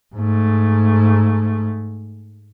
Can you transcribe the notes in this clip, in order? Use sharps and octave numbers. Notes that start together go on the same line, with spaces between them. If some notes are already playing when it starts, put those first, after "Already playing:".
G#2 A3